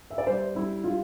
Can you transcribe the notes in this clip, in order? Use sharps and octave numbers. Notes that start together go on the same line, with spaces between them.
E5
D5
G3 C5
G3 E4
G3 F4